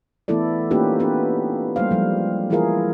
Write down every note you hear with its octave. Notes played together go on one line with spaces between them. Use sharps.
E3 A3 B3 E4 A4 D5
A#3 C#4 D#4 F4 G4 B4
B3 D4 G4 B4
G3 A3 A#3 C5 F5
F3 G3 G#3
E3 E4 F4 G#4 A#4 F5